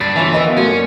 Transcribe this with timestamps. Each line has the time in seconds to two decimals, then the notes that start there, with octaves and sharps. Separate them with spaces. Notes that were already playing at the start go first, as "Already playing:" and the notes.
0.01 G2 D4 B5 A6
0.16 D2 E3 D4 F4 C#5 E5 G#5
0.33 B3 B4 D#5 E5 G5 E6
0.45 A#3 F#4
0.57 F#2 A3 C#4 F4 F#4
0.70 D5 F#5